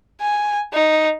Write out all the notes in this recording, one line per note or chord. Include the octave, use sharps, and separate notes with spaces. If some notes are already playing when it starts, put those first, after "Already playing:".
G#5
D#4